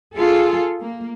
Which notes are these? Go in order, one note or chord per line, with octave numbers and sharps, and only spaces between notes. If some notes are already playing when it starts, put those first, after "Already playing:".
F4 G#4 A4
A#3